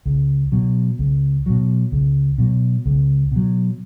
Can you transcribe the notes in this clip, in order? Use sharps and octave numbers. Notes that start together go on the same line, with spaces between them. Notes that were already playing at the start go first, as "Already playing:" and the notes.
C#2
B2 F#3
C#2
B2 F#3
C#2
B2 F#3
C#2
B2 F#3